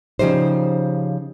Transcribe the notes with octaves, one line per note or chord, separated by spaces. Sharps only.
C#3 F3 G3 D#4 C5